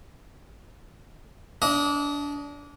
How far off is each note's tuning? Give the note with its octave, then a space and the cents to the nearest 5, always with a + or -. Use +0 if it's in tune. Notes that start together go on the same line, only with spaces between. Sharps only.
D4 -25 D#5 +15